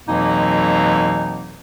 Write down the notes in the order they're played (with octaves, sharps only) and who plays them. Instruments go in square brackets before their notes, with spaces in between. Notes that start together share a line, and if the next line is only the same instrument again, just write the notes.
[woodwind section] F2 B2 E3 F#3 A#3 D#4